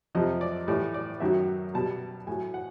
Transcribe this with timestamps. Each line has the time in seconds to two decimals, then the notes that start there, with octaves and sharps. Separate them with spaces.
0.15 F2 C3 F3 D#5
0.41 D5
0.67 A2 E3 G3 D5
0.94 D5
1.20 F#2 D#3 F#3 E5
1.74 B2 G3 A5
2.27 A2 F#3 G#5
2.54 F#5